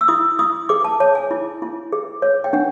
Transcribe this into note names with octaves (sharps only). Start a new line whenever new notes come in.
E6
E4 D#6
E4 D#6
G#4 D6
A5
C#5 A5
G#5
E4
E4
G#4
C#5
G5
D4 F#5